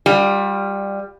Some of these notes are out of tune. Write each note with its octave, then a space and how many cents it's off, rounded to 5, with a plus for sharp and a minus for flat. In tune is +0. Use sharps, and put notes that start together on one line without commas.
G3 +15 F4 +45